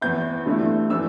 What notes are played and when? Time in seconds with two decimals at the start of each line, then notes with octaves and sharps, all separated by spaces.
0.01 E2 E3 B3 E4 G6
0.46 G2 D3 A3 E4
0.90 E3 A3 D4 E6